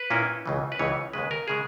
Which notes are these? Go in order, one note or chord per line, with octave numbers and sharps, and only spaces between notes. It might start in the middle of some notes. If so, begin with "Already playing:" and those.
Already playing: B4
A#2 A#3 C#4 E4
C#2 C#3 E3
B4
C#2 C#3 E3 C#5
D#2 C#3 G#3 B4
A#4
C#3 G#3 G#4